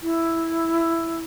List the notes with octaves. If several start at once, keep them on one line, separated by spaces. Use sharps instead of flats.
E4